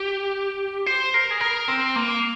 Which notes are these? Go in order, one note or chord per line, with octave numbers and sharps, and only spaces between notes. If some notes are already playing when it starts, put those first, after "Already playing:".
Already playing: G4
C5
A#4
G#4
A#4
C4
A#3